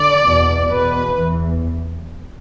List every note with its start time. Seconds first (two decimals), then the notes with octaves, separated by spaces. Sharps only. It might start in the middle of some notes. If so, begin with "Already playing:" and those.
Already playing: D3 D5
0.26 E2 B2
0.71 E2 B2 B4
1.19 E2 E3